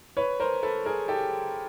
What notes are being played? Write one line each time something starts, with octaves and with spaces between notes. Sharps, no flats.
B4 C#5
A#4 C5
A4 B4
G#4 A#4
G4 A4